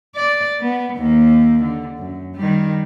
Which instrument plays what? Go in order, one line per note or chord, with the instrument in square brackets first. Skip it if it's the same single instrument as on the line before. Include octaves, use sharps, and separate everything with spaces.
[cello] D5
B3
D#2 A#3
D3
F#2
D#3 G3